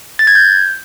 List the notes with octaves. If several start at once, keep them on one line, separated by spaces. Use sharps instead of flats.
A6
G#6
G6